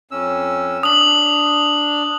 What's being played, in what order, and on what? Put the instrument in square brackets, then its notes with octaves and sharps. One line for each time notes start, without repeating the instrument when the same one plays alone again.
[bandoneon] F2 C#4 E6
[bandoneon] D4 [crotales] D#6 F#7